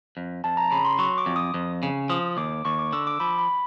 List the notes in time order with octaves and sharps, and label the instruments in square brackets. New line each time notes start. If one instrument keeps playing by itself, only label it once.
[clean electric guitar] F2
[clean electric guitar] F2 [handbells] A5
[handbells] A#5
[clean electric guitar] C#3 [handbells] B5
[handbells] C6
[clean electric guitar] F#3 [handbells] C#6
[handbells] D6
[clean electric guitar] F2
[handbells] D#6
[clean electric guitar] F2
C#3
[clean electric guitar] F3 [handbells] D#6
[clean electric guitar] D#2 [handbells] D6
[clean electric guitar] D#2 [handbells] C#6
[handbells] D6
[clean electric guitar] D3 [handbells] E6
[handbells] D6
[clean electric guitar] F3 [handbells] B5
[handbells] B5